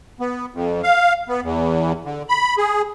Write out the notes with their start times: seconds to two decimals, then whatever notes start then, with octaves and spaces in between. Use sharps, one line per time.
0.20 B3
0.54 F2
0.83 F5
1.29 B3
1.43 E2
2.05 D3
2.29 B5
2.58 G#4